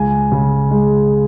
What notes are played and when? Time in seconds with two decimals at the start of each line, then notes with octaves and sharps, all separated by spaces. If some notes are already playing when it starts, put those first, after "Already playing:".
Already playing: C#2 G#5
0.32 C#3
0.71 G#3